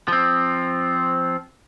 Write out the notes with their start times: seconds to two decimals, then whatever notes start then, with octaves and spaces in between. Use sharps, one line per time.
0.08 F3 C4